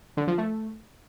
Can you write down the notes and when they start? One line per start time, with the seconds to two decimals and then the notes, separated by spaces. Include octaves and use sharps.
0.17 D3
0.27 F3
0.38 A3